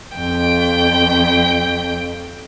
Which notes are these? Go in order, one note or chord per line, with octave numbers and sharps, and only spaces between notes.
F2 G5